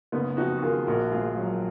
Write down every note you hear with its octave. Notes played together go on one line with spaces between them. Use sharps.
F#1 B3 D#4
F2 D#4 F#4
F#4
D#3 F4 G#4
A#1 F#4 A#4
G#2 F4 G#4
F#3